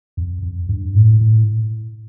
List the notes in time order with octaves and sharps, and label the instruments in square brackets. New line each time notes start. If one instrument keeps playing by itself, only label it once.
[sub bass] F2
F2
G2
A2
A2